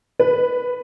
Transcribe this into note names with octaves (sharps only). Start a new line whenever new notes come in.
B4